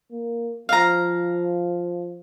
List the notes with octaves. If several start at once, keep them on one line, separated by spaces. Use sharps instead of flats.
A#3
F3 F5 A#5